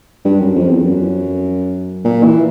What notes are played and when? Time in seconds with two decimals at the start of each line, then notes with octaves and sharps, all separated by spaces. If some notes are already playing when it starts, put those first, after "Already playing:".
0.25 G2
0.41 F#2
0.55 F2
0.71 E2
0.85 F#2
2.04 A#2
2.24 E3